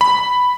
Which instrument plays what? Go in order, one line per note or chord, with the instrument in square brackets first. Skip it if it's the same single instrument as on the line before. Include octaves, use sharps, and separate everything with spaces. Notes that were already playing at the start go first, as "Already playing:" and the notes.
[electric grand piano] B5